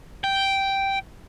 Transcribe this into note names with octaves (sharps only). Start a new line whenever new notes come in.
G5